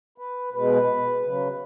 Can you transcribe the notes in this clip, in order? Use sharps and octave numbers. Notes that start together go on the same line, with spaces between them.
B4
B2 G#3 B4
C#3 F#3